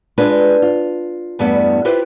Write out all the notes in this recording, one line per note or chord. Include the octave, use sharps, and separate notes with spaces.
G#3 D4 F4 B4
F4
E2 G2 G3 A3 B3
E4 F4 G4 B4 C5